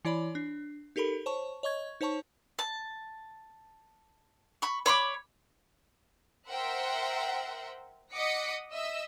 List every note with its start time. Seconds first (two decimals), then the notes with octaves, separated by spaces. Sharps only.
0.05 E3 E4 C#5 D5 B5
0.35 D4
0.96 D#4 G4 A4 A#4 B5
1.26 C5 C#5 A5 C#6
1.63 C#5 D#5 C#6 G#6
2.01 D#4 C5 C#5 A5 C#6
2.59 A5
4.62 B5 C#6
4.86 C#5 B5 C6 D6
6.48 A#4 C5 E5 F#5 G5
8.15 D#5 F#5 D6 D#6 B6 C#7
8.74 D#5 E5 E6